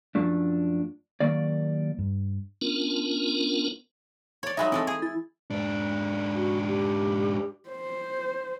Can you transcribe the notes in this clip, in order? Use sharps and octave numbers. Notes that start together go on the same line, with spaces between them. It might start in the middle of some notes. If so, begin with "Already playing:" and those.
F#2 F3 F#3 A3 D4
D#2 G#2 D#3 F#3 A#3 D5
G2
B3 C#4 D4 F4 A#4
C#5 D5
F#3 G#3 D#4 E5 B5 A#6
E3 G#3 A3 C4
G#4 G#5
E4 A6
G#2 D4
F#4
G4
C5